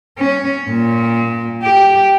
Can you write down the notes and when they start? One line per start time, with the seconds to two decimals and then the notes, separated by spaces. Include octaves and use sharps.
0.18 C#4
0.69 A#2
1.63 G4